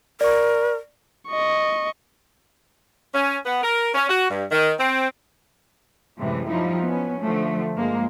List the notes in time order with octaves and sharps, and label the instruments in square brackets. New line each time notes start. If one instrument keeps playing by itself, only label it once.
[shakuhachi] A#4 [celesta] D5 C#6
[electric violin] D#5 C#6
[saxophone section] C#4
B3
A#4
C#4
F#4
G2
D#3
C4
[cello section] F#2 A2 C3 E3 G3 G#3
F3 G3 D#4 E4
B3 C#4
D3 F3 A3
G2 F3 G#3 A#3